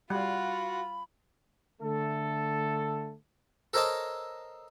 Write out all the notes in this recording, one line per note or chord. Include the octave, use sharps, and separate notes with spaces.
G3 F4 F#4 F#5 B5
D3 A3 A4
A4 A#4 C5 C#5 D#5 A5